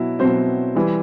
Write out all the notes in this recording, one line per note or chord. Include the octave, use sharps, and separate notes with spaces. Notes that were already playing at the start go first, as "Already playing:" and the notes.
Already playing: B2 F#3 E4
B2 F#3 C4 C5
E3 G3